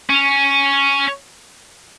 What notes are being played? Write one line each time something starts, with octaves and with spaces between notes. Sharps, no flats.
C#4